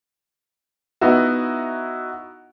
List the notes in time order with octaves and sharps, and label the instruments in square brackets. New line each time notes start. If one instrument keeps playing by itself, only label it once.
[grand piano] B3 D#4 E4 F#4